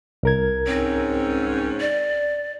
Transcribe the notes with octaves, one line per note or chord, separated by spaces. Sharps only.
C2 A#4 G#6
G#2 C4 C#4
D5